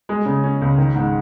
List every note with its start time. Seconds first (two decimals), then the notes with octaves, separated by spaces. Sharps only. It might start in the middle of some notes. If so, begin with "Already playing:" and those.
0.09 G#3
0.26 C#3
0.43 C#4
0.61 C#2
0.78 D#3
0.96 G#2